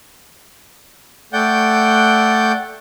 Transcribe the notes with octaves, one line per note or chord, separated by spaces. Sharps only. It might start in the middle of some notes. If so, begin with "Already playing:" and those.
A3 D5 F#5 G5 G6